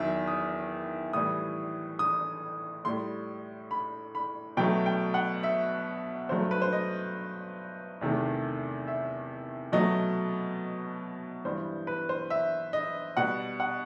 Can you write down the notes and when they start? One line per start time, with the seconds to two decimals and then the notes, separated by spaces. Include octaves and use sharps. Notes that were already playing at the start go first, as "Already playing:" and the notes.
Already playing: E2 D#3 F#3 E5
0.28 D#6
1.13 A2 E3 G3 D#6
1.99 D#6
2.85 A2 G3 C6
3.71 B5
4.15 B5
4.57 B2 F#3 A3 G5
4.86 G5
5.14 F#5
5.43 E5
6.29 G2 F#3 A3 C5
6.51 B4
6.62 C5
6.73 D#5
8.01 E2 C3 D#3 A3
8.87 E5
9.72 B2 F#3 A3 D#5
11.45 G2 E3 G3 C5
11.87 B4
12.09 C5
12.30 E5
12.73 D#5
13.17 B2 G3 F#5
13.60 F#5